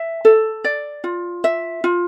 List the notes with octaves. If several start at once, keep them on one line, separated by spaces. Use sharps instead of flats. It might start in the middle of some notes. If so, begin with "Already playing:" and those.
Already playing: E5
A4
D5
F4
E5
F4